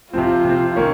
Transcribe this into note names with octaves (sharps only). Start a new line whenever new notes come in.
C3 F3 C4 F4
C3 F3 C4
D#3 A#3 C#4